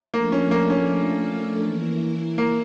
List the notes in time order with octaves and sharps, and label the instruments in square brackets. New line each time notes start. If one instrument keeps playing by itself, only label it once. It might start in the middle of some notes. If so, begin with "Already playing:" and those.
[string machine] F3 A3 D4 A4 [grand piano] A#3
[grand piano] C#4
A#3
C#4
[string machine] E3 A#3 E4 A#4
[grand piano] A#3